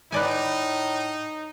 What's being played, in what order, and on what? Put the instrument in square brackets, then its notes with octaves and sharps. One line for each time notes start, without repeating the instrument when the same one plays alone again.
[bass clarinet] A2 [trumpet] D#4 [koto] B4 D5 G#5